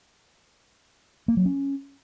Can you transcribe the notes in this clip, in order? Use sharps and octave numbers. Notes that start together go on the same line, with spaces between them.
A#3
F#3
C#4